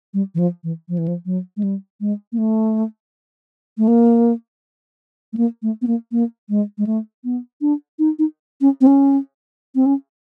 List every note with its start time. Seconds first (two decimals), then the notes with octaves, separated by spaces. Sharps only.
0.14 G3
0.35 E3
0.39 F3
0.64 E3
0.89 F3
0.98 E3
1.08 F3
1.26 F#3
1.57 G#3
1.63 G3
2.01 G#3
2.32 A#3
2.38 A3
3.78 A3
3.88 A#3
5.33 A3
5.37 A#3
5.63 A3
5.82 B3
5.87 A#3
6.12 A#3
6.49 G#3
6.78 G#3
6.87 A3
7.24 B3
7.61 D4
7.99 D#4
8.19 D#4
8.61 C#4
8.81 C4
8.87 C#4
9.75 C4
9.86 C#4